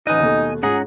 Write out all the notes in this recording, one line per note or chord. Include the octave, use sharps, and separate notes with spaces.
A1 D#4 B4 D#5 G#5 F#6
D#2 B2 A3
G#2 C#4 F4 G#4 F#5 A#5